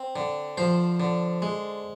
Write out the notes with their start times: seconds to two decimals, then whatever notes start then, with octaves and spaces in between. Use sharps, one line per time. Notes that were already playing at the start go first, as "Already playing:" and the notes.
Already playing: C4
0.16 D3
0.57 F3 C5
1.00 D3
1.42 G#3